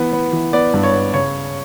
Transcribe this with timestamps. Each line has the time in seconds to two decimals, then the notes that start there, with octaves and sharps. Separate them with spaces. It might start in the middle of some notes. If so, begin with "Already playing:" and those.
Already playing: E3 B3
0.13 B3
0.33 E3
0.53 B3 D5
0.74 G2
0.83 C#5
0.93 B3
1.13 C#3 C#5